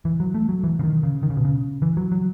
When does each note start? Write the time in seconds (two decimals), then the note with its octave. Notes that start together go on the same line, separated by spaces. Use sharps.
0.05 E3
0.20 F#3
0.34 A3
0.49 F#3
0.64 E3
0.79 C#3
0.83 D#3
1.03 C#3
1.23 D#3
1.30 C#3
1.37 B2
1.45 C#3
1.82 E3
1.97 F#3
2.12 F#3